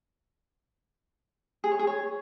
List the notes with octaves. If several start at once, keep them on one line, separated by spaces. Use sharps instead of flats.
G#4
C#5
G#4
C#5